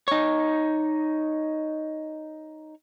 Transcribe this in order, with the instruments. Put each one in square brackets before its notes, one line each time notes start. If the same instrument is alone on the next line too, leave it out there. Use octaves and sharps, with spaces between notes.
[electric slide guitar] D#4 C#5